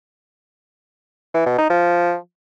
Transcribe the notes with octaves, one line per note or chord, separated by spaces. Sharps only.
E3
B2
D#4
F3